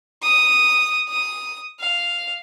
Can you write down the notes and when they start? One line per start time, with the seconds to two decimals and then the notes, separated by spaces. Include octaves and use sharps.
0.22 D#6
1.08 D#6
1.79 F5